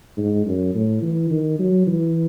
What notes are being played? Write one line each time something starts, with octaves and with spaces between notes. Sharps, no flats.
G#2
F#2
A2
E3
D#3
F#3
E3